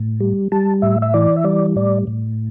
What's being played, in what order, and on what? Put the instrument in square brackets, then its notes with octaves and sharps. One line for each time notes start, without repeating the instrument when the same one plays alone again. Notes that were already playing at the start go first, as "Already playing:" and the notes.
Already playing: [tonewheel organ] A2
G3
G3 A5
A2 E5
E5
E3 D5
E5
G3 D5
A2 D5
A2